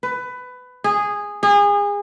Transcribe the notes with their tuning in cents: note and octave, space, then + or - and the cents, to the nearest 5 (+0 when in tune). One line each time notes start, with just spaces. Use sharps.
B4 +20
G#4 -10
G#4 -30